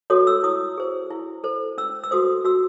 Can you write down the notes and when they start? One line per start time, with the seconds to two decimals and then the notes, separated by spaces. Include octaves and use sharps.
0.10 F#4 A4 C#5 D#6
0.27 E6
0.43 E4 D#6
0.78 G#4 C5
1.10 E4
1.44 A4 C5
1.78 C#4 E6
2.04 E6
2.11 F#4 A4 C5 D#6
2.45 F#4 E6